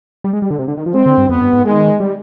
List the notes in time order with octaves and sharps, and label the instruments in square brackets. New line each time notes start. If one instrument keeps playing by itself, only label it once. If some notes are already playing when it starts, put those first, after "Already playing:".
[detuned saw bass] G3
G#3
G3
D3
C3
D3
D#3
F3
[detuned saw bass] G#3 [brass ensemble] C4
[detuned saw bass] D3
G2
[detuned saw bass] F2 [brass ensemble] B3
[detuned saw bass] G2
G#2
[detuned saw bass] D#3 [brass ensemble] G#3
[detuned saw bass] G3